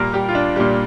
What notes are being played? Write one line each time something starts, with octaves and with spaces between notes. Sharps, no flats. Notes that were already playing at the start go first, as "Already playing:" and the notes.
Already playing: A#2 G3 A#3 A#4
G3 G4
F4
D4
A#2 G3